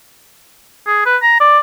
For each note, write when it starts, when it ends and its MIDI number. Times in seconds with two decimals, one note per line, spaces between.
0.87 1.03 68
1.06 1.17 71
1.22 1.37 82
1.40 1.59 74